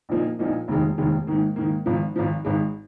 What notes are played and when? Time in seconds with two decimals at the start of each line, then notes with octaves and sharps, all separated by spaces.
0.09 A#1 A#2 F3 A#3 D#4
0.39 A#1 A#2 F3 A#3 D#4
0.68 F1 D#2 D#3 G#3
0.98 F1 D#2 D#3 G#3
1.27 G#2 D#3 A#3
1.56 G#2 D#3 A#3
1.86 G#1 G#2 F3
2.16 G#1 G#2 F3
2.45 G#1 G#2 G#3